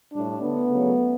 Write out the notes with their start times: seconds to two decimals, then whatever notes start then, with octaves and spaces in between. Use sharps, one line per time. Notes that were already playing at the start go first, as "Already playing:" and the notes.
0.11 A2 G3 D4
0.41 D3 A3 B3
0.70 C#3 F#3 A3